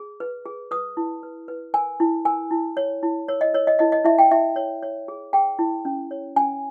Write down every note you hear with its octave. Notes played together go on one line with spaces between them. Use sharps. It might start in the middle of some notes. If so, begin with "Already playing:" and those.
Already playing: G#4
B4
G#4
B4 D#6
E4
B4
B4
A#4 G#5
E4
A#4 G#5
E4
C#5
E4
A#4 C#5
D#5
A#4 C#5
D#5
E4 D#5
D#5
E4 E5
G5
E4 E5
C#5
C#5
G#4
G#4 G5
E4
C#4
C#5
C#4 G#5